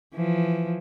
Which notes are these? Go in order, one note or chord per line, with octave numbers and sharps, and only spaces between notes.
E3 F3